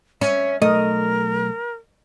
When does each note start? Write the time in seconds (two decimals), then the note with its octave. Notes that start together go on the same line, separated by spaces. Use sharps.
0.21 C#4 E5
0.62 B1 A3 A#4 D#5